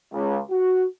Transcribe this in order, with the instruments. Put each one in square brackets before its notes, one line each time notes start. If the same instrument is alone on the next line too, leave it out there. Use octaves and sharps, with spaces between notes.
[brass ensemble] C#2
F#4